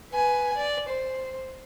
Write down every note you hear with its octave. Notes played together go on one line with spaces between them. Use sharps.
B4 G#5
D5
C5